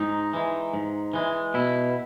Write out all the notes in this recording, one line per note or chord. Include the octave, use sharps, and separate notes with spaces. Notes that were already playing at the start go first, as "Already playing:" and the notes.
Already playing: G#2 D#4
E3 G#3
G#2
E3 G#3
B2 E4